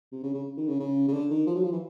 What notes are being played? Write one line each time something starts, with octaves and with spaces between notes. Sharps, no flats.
C3
C#3
C#3
D#3
C#3
C#3
C#3
D3
D#3
F3
F#3
F3
E3